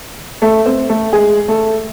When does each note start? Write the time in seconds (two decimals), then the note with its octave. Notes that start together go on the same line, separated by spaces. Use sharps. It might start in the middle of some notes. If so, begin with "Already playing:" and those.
0.42 A3 A4
0.66 C4 C5
0.89 A3 A4
1.13 G#3 G#4
1.48 A3 A4